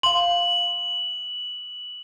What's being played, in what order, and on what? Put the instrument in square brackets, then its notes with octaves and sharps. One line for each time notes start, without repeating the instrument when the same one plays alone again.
[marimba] F5 C6 [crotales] F#7